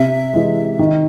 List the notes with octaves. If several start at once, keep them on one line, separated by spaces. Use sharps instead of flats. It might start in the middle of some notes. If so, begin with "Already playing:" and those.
Already playing: C3 E5
E3 G#3
D#3